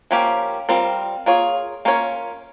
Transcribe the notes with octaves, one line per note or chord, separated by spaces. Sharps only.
F3 A#3 C#4 G4
G3 C4 F4 A#4
A#3 F4 G#4 C#5
A#3 C#4 F4 A#4 C#5